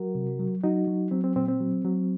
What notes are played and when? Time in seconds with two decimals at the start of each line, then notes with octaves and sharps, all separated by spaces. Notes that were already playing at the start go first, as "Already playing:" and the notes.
Already playing: F#3 F#4 A#4
0.15 C3
0.39 F#3
0.64 F#3 D#4 F#4
0.87 F#3
1.11 F#3 C4
1.24 C4
1.36 A#2 C4
1.48 C4
1.60 F#3
1.85 F#3